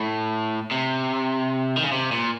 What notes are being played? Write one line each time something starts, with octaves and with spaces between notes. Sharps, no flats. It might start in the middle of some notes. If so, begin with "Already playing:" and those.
Already playing: A2
C3
D#3
C#3
C3
A#2